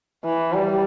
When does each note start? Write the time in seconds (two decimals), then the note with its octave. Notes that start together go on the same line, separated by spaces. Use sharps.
0.25 E3
0.53 G3